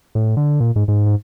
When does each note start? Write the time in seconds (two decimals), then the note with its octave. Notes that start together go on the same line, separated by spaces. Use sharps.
0.15 A2
0.37 D3
0.60 A#2
0.76 G#2
0.88 G#2
1.06 G#2